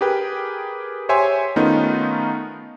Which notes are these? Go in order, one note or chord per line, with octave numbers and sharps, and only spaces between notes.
G4 G#4 A#4 B4 G5
G4 C5 C#5 E5 G#5 C6
D#3 A3 B3 C#4 D#4 F4